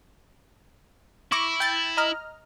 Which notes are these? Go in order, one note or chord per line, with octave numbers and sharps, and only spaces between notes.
E4 C#6 D6 A#6
G5 G6 A6
D#5 A#5 F6